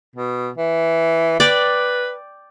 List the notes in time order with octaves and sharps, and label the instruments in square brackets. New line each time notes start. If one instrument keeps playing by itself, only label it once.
[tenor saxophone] B2
E3
[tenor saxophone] B4 [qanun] D5 G5